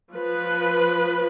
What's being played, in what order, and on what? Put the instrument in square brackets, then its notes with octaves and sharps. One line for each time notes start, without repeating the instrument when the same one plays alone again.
[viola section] F3 B4